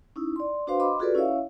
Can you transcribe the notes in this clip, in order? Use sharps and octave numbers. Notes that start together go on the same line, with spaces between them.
C#4 D#4 E4
D5 C6
D4 F#4 B4 C5 F5 C6
D#5 B5 C6 D6
F4 F#4 G#4 A4 B4 D5
C#4 E4 C#5 E5 F5